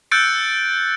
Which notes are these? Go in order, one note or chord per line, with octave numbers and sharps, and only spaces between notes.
E6 F#6 G6 A6 C#7 D7